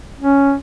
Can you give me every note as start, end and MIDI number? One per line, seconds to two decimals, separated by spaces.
0.22 0.54 61